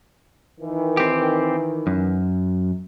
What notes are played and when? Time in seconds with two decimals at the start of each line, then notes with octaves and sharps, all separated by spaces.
0.60 D#3 E3
0.97 C4 G4
1.87 F#2